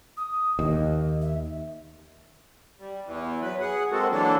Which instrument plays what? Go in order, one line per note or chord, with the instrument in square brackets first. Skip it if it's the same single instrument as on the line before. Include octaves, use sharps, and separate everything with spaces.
[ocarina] D#6
[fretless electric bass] D#2 [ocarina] D#5
[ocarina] E5
[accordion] G3
E2 E3
F#3 B4
G#4 F#5
G#3 A#3 C4 F#4 A4
D3 E3 F#3 A#3 D4 A4